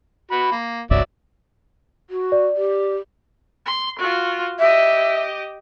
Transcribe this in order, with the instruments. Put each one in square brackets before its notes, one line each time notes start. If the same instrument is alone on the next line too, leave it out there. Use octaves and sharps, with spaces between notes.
[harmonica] F#4 B5
A#3
[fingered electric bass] F#1 C2 G2 [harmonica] F#3 D5 E5
[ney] F#4
[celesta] D5
[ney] G4
[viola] C6
F4 F#4
[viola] G4 D#5 [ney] E5